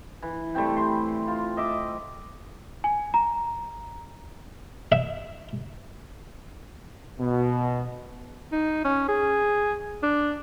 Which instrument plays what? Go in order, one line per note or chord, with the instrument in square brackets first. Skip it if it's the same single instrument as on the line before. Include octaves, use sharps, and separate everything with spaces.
[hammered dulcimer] E3
G3 A3 C4 G5
C6
F4
D#5 E5 D6
[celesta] G#5
A#5
[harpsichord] E5
[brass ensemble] B2
[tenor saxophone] D#4
C#4
G#4
D4